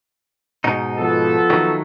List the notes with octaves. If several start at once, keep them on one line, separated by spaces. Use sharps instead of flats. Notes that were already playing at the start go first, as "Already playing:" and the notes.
G#2 B2 D#4
F3 B3 A4
D#3 F#3 A3